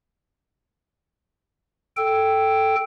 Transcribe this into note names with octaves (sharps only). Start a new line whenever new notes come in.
A4 G5